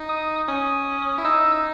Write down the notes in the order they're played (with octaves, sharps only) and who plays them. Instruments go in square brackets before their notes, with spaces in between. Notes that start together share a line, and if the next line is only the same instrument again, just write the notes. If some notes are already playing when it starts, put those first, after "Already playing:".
Already playing: [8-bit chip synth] D#4
[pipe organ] D#6
[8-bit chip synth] C#4 [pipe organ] D#6
[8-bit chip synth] E4
[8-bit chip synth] D#4 [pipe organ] E6